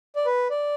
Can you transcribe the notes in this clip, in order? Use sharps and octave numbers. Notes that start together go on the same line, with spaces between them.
D5
B4
D5